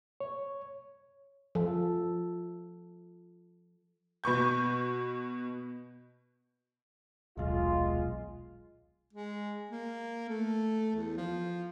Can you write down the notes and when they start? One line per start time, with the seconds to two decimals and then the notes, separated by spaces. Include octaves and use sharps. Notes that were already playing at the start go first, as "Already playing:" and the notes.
0.20 C#5
1.55 F3 A4
4.24 B2 B4 C#6 G6
7.37 D#1 B1 G#3 F4
9.13 G#3
9.71 A#3
10.29 A3
10.95 E2
11.17 F3